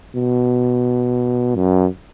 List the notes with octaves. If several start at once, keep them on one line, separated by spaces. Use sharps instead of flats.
B2
F#2